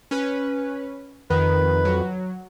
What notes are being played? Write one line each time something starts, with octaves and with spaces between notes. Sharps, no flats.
C#4 B4
F2 D#3 B4
F#3